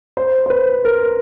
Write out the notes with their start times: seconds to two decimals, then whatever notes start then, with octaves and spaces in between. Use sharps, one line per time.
0.17 C5
0.46 C5
0.50 B4
0.85 A#4